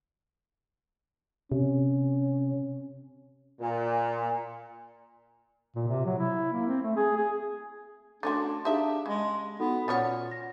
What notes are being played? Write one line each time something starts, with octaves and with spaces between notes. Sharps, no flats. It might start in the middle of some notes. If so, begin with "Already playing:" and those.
C3 C#4
A#2
A#2
C3
F#3
E4
A#3
C4
A3
G#4
G#4
A3 C#4 D4 F#4 C6 D6 A6
D4 D#4 G4 G#4 E5 F5
C#3 G#3
B3 D#4 F#4 A4
A#2 B3 C#4 C#5 F#5 F6 A6
A#6